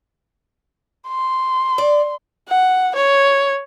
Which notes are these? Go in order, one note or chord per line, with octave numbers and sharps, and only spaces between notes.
C6
D5
F#5
C#5